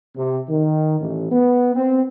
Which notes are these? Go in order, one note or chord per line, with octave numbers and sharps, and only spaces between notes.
C3
D#3
A1
B3
C4